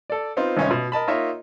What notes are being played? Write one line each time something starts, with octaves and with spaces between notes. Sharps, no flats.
A4 D5
B3 C4 D#4 F4
G#1 G2 C3 C#4 D#4 C#5
B2
A#4 D#5 A5 B5
A#3 D#4 F4 C#5 D#5 E5